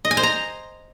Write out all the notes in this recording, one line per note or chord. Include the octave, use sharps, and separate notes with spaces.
D#5
G#5
C5
A#5